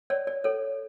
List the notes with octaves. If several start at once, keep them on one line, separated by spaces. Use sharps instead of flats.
C#5 D5
D5
A4 C#5